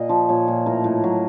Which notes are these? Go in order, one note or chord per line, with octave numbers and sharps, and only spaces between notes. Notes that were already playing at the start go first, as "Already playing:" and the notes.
Already playing: A#2 D#5
F3
A#2 C#5
A#2
A2 A#4
A2
F#3